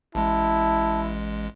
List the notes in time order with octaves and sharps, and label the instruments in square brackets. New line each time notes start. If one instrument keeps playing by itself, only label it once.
[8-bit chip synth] A1 G#3 [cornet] E4 [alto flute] A5